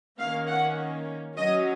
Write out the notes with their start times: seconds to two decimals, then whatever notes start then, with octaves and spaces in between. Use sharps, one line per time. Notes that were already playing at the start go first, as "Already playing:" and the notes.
0.18 D#3 A#3 C#4 F5
0.48 F#5
1.36 F#3 C#4 D#5